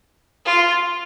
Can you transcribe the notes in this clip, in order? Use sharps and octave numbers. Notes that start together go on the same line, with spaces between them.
F4